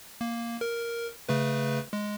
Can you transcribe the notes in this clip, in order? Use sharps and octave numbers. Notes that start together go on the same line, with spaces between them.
A#3
A#4
C#3 A3 B4
G#3